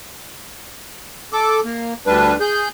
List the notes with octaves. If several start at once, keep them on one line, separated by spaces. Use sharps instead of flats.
A4 D6
A#3
D2 G3 D4 B4
G#4 G6